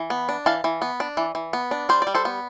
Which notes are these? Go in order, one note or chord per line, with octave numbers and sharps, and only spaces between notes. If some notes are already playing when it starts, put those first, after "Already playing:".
Already playing: E3
B3
D4
E3 F5 A5
E3
B3
D4
E3
E3
B3
D4
G3 C5
G3 D5
A4 C5
B3